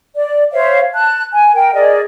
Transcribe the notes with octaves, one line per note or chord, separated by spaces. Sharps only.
D5
C5 C#5 E5 F5
A5 F#6
G#5
A#4 G5
G#4 A#4 D5 D#5